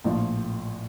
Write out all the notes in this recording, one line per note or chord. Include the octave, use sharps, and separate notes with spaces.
A#1 A2 F3